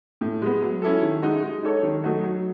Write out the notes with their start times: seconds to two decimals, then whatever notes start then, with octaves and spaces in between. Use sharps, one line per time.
0.21 A2
0.42 G#3 B3
0.62 F#3
0.82 C#4 E4 A4
1.02 D#3
1.22 G#3 D#4 F#4
1.42 G#3
1.63 D#4 A4 C#5
1.83 D#3
2.04 F#3 A3 D#4 F#4
2.23 F#3